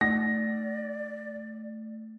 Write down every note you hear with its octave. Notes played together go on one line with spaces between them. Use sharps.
A3 D5 A#6